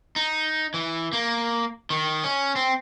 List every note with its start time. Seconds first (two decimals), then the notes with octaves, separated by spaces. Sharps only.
0.16 D#4
0.74 E3
1.13 A#3
1.90 D#3
2.24 C#4
2.56 C4